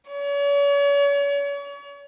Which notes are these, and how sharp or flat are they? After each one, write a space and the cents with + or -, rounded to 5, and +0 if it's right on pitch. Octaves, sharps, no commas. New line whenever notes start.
C#5 +40